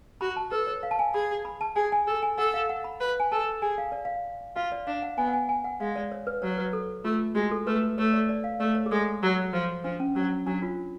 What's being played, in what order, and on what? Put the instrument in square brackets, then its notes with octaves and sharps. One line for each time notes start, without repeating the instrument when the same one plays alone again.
[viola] F#4 [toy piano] B5
[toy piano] A5
[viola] A4 [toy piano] B4
[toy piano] C#5
F5
A5
G#5
[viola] G#4 [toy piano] B5
[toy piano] B5
A5
[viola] G#4 [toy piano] G#5
[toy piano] G#5
[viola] A4
[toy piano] G#5
[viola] A4 [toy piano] F#5
[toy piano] F5
F#5
B5
[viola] B4
[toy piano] G#5
[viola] A4 [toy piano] A5
[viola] G#4 [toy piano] G#5
[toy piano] F5
D5
F5
[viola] F4 [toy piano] F5
[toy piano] D5
[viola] D4 [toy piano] F5
[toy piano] F#5
[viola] B3 [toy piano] G#5
[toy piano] F#5
G#5
G#5
F#5
[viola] G#3 [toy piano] F5
[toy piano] D5
C#5
B4
[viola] F#3 [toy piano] C#5
[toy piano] B4
A4
[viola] A3 [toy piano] F4
[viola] G#3 [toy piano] F#4
[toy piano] A4
[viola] A3 [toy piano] B4
[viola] A3 [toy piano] C#5
[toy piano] D5
D5
F5
[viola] A3 [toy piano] D5
[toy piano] C#5
G#4
[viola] G#3 [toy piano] A4
[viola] F#3
F3
[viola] F3 [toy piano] D4
[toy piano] C#4
[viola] F#3 [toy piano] C#4
[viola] F#3 [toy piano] D4
[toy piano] F4